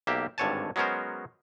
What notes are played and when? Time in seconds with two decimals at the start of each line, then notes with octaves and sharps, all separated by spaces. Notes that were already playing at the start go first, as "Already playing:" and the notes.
0.07 B1 A#3 G4 E5
0.38 G#1 G2 D3 C#5 G#5 A5
0.76 F#3 G#3 B3 C#4 A#4 C5